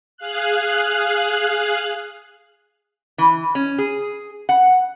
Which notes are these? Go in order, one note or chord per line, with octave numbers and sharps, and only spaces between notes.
G#4 F5 F#6
E3
C#4
G#4
F#5